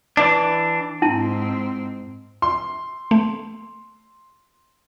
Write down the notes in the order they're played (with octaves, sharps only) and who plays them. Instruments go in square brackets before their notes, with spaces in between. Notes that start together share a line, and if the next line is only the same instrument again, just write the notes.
[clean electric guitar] E3 D4
[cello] G#2 C4 [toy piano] E4 A5
[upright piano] C6
[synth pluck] A3